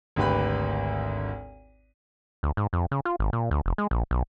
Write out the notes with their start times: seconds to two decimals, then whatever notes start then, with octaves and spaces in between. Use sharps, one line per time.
0.16 G#1 D2 G4 B4 B5
2.43 D2
2.57 G#2
2.73 F2
2.91 C#3
3.05 F4
3.19 G#1
3.33 A#2
3.51 D2
3.66 F1
3.78 G#3
3.91 A#1
4.11 B1